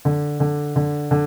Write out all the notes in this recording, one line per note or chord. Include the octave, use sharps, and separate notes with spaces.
D3
D3
D3
D3